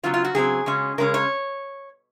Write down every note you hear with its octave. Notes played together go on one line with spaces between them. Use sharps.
C#3 F#3 C4 F4
F4
F#4
C#3 F#3 C4 G#4
C#3 G#3 C#4
C#3 G#3 C#4 A#4
C#5